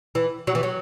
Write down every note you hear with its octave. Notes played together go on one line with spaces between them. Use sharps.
E3
F#3
E3
F#3